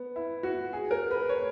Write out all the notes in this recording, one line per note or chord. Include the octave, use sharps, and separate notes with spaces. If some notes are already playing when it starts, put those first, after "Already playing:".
Already playing: B3
E4
F#4
G#4
A#4
B4
C#5